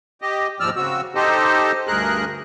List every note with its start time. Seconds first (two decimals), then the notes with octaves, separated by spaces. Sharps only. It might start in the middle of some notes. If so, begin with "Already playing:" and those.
0.22 G4 D#5
0.60 D#2 G#2 F3 D5 E6 F6
0.76 C#3 C4 F#4 E6
1.15 D#4 G4 A4 C5 D#5
1.87 D2 G2 G#4 A#4 F#6